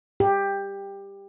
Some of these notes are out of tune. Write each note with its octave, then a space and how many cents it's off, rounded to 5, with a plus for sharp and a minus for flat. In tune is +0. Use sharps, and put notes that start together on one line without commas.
G4 +15